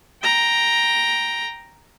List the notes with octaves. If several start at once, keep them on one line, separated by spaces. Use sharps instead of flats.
G5 A#5